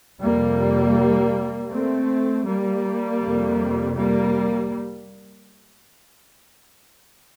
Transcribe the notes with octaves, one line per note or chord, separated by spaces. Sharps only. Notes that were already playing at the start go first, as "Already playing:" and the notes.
F2 C3 G3 A#3
A3 C4
G3 A#3
F2 C3
G3 A#3